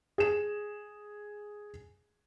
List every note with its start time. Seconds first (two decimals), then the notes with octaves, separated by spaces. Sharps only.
0.18 G#4 E7